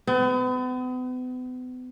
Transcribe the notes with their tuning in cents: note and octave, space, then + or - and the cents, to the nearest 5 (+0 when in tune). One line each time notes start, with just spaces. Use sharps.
B3 +40